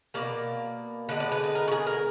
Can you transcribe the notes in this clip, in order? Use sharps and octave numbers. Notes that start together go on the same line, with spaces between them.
B2 F#3 A#3 D5
D3 G#3 B3 B4
D5
B4
B4
A#4
F#4
G#4
A#4